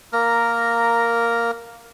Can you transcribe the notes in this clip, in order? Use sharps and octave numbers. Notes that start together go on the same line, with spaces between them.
A#3 A#4 A#5